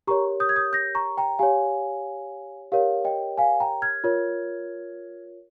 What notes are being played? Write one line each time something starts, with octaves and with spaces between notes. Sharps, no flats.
G4 A#4 C#5 A#5 C#6
D#6 G6
G#6
D#6 G6
G6 A#6
A#5 C#6
G5 A#5
G4 C#5 F5 G#5
G4 A#4 C#5 F5
D#5 G5
F5 G#5
G5 A#5
F6 G#6
F4 A#4 C#5